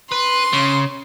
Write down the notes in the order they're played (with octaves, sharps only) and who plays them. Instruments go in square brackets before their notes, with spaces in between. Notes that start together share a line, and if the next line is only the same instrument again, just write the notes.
[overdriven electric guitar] B4 [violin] C6
[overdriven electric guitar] C#3